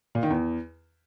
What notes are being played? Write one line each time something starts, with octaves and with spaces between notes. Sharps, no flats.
A#2
D#3
E2